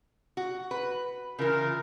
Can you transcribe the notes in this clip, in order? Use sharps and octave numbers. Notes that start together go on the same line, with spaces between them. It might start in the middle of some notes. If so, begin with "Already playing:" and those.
F#4
B4
C#3 E3 F4 A#4